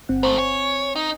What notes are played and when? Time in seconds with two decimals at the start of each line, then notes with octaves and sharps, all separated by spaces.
0.09 G1 C4 F#5
0.23 G#2 A3 C5
0.38 C#5 G#5
0.96 D#4